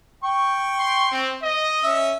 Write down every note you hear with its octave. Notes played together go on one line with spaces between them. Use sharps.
G5 C#6
C6
C4
D#5
C#4 E5